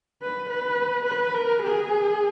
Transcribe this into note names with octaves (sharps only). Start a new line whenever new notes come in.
B4
B4
B4
A#4
G#4